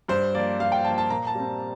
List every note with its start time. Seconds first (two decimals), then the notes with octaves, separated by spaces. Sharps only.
0.08 G2 C5
0.34 F3 A#3 D5
0.60 G2 F5
0.72 G5
0.84 F3 A#3 A5
0.98 A5
1.10 A#2 A#5
1.27 A5
1.35 G3 C4